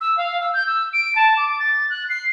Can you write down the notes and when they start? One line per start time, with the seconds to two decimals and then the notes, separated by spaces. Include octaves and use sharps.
0.01 E6
0.17 F5
0.40 E6
0.54 G6
0.67 E6
0.93 D7
1.16 A5
1.37 D6
1.59 A6
1.90 F#6
2.09 C7